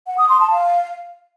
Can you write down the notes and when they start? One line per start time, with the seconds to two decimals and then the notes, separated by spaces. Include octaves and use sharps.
0.07 F#5
0.18 D#6
0.29 C6
0.40 A5
0.51 F5